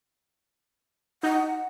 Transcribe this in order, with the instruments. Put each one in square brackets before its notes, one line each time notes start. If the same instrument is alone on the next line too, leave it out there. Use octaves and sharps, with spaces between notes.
[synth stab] D#4 [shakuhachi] F#5